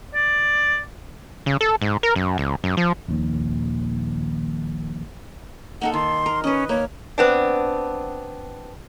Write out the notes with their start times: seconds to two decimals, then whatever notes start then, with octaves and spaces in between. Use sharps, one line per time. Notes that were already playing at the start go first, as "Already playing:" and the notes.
0.15 D5
1.46 C#3
1.61 A4
1.82 G#2
2.03 A#4
2.16 F#2
2.38 C#2
2.64 F#2
2.77 F3
3.08 D#1 A#1 D#2
5.81 A#3 D#4 A4 F#5
5.94 D#3 C6
6.26 A#4
6.44 C#4 B4 D#5
6.69 A#3 C#5
7.18 B3 C4 D4